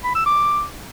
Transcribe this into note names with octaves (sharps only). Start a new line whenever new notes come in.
B5
E6
D6